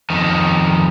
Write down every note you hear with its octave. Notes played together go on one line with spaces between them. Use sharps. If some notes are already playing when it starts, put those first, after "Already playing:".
F2 D#3